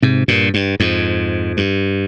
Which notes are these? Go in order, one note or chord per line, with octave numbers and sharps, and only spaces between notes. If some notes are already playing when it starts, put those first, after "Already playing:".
G#2 C3
G2 A#2
G2
F2 G#2
G2